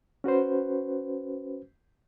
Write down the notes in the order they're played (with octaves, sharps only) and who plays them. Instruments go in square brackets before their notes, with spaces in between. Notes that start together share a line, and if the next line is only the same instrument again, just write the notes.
[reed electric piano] C#4 F#4 B4 C5